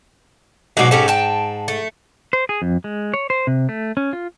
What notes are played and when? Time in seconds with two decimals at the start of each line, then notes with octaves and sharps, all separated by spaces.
0.77 G#2 B2 F#3 D4
0.91 G#2 C#4 G4 A4
1.08 G5 A5
1.68 A3
2.33 C5
2.49 G#4
2.62 F2
2.84 G#3
3.14 C#5
3.30 C5
3.47 C3
3.69 A3
3.97 C#4
4.13 F4